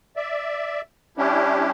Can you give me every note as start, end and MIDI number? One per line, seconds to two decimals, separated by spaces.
0.16 0.81 74
0.16 0.81 76
1.18 1.71 55
1.18 1.71 61
1.18 1.71 62
1.18 1.71 64
1.18 1.71 67